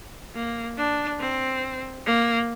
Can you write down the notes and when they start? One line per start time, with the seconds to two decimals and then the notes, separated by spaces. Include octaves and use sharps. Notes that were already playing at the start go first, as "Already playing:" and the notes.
0.35 A#3
0.77 D4
1.20 C4
2.06 A#3